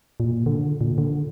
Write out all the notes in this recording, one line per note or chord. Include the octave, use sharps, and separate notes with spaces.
A#2
D3
A#2
D3